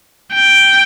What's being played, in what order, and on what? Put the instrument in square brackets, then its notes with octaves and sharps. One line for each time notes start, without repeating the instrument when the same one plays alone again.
[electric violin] G5